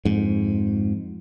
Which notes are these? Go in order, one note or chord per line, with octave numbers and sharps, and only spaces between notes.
F2 G#2